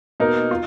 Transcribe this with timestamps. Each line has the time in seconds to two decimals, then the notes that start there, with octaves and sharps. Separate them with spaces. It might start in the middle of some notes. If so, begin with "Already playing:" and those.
0.20 B2 A#3 D#4 A#4
0.51 F4